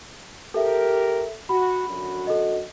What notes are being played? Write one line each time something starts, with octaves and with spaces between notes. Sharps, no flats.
G4 A4 A#4 E5
F#4 B5
F#2 D3 F#4
A4 D#5